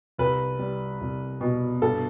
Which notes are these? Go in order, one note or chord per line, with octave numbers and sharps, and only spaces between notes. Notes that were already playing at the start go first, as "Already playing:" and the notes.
C2 B4
G3
C2
B2
G2 A4